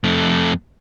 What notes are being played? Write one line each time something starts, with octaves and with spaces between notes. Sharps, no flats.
F2 A3